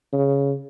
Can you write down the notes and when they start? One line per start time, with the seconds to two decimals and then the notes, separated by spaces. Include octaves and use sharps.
0.13 C#3